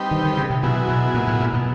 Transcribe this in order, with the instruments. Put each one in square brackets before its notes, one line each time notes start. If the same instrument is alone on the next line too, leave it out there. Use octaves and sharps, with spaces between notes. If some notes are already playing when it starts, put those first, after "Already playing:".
Already playing: [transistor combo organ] G3 C4 D#4 G4 B4
[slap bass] D#3
D#3
C#3
C3
[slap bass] B2 [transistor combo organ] F#3 B3 E4 G#4
[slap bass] B2
A#2
A2
A#2
B2